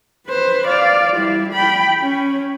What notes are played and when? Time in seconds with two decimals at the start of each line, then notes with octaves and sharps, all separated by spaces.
0.27 B4 C5
0.67 D5 F5
1.16 G3 E4
1.53 G5 B5
2.00 C#4